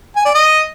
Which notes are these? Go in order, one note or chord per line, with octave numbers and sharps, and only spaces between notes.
G#5
D5
D#5